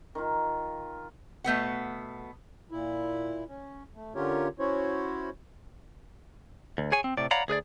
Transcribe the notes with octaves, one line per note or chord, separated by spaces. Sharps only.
D#3 F4
B2 A3 B3 F#5
A#2 E4
C#4
A3
D3 C#4 F4 G4 A#4 C#5
C#4 E4 F#4 C5 C#5
D2
G#4 C#5 G#5
C4
A2 C3 D5
C#5 D5 F5 F#5 A#5 B5
D2 G#4 B4 D5